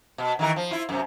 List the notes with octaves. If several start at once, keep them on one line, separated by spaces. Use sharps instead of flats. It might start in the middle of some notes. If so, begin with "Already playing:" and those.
B2
D#3 E3 A#4
F3
E4 F4
F#2 C3